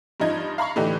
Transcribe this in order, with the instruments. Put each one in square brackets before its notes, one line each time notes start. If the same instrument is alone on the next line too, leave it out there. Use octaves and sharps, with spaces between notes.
[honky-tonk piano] G2 F3 D#4 G#6
F5 A#5 B5 C#6
A2 D3 E3 D#4 G4